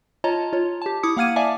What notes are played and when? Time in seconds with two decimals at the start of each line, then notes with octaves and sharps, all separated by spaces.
0.24 F4 C#5 D#5 A5 A#5
0.53 F4 C#5
0.82 G4 A5
1.03 E4 D6 D#6 C#7
1.17 A#3 F5 F#5 F6 G#6 D#7
1.36 D5 E5 F5 G#5 A5 D6